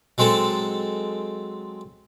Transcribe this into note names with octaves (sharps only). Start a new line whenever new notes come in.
F#3 G#3 C4 A4